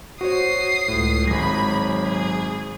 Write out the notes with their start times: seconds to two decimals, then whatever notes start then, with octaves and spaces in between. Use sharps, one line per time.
0.21 F#4 C5 C#5 D#6 C7
0.88 C#2 A2
1.27 G#1 F#3 G#3 G#4 B5 A#6
2.03 G#4